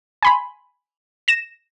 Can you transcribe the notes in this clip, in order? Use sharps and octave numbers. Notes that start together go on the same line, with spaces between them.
G#5 B5 C6
A#6 E7